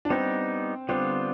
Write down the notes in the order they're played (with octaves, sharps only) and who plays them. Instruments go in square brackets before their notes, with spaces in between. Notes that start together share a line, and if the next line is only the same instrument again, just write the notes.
[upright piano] D4
[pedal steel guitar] G3 B3 D#4 [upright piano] C4
[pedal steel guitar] D3 G3 B3 D4 F4 [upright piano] C4